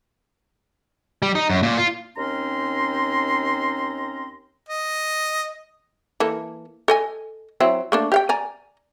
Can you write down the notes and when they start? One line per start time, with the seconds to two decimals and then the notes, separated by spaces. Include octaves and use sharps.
1.22 G3
1.35 D#4
1.49 F#2
1.63 A#2
1.78 F4
2.16 D#2 C4 C#4 A#5 C6
4.69 D#5
6.20 E3 A#3 A4
6.88 A4 D#5 G#5
7.60 F#3 C4 E4
7.92 A3 A#3 D4
8.12 G4 F5 G5
8.29 D5 G#5 A#5